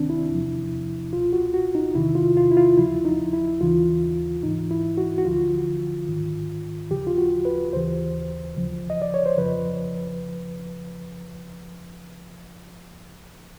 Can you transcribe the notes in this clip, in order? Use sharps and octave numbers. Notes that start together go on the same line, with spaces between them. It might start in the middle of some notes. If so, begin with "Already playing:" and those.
Already playing: D2 C3 D#3 C4 D4
E4
E2 C3 F3
C#2 B2 F4
F#4
F#4
D#4
E2 C3 D#3 E4
F4
F4
E4
F4
D#2 C#3 F3 E4
D#4
E4
D#2 C#3 E3 F4
G#2 E3 D#4
E4
F#4
F#4
D2 D3 F3 F4
G#2 D#3
D#2 C#3 F3 G4
F4
F#4
B4
D#2 C#3 E3 C5
D2 C#3 F3
D#5
D5
C#5
C5
F2 C#3 F3 B4